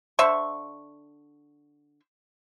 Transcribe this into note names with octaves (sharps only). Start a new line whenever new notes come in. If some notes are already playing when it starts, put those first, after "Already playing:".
D3 C5 E5 C#6